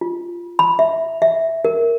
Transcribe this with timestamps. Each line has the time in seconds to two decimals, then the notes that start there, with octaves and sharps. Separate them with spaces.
0.01 F4
0.59 B5
0.79 E5
1.22 E5
1.65 A#4